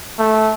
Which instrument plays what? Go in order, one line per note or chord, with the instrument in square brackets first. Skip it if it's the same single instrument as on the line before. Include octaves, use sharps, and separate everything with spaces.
[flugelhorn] A3